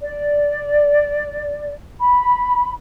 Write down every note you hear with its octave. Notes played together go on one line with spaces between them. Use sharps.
D5
B5